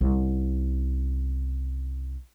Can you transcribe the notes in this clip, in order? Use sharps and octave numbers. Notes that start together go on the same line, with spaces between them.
C2 C#3